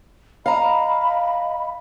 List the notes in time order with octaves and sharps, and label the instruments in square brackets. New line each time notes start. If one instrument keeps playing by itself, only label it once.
[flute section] D#5 B5 [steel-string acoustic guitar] F5 A#5